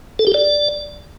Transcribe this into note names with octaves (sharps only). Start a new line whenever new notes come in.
A4
G4
D5